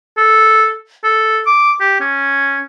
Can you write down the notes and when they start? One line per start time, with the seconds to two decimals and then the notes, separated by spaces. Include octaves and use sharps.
0.18 A4
1.04 A4
1.47 D6
1.81 G4
2.00 C#4